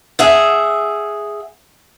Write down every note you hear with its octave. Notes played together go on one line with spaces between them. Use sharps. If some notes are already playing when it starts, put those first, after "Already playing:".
G#4 E5 F#5